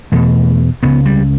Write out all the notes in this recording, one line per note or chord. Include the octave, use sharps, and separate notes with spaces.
E2 B2 A3
C#2 C#3 B3
G3